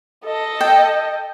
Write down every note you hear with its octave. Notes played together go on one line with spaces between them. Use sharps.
A4 D#5
G5